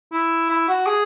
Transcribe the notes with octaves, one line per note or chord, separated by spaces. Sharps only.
E4
E4
F#4
G#4